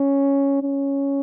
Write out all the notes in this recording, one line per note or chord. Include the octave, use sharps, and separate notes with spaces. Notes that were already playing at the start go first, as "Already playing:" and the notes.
Already playing: C#4
C#4